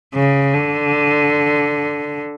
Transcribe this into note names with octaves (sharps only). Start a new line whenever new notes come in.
C#3
D3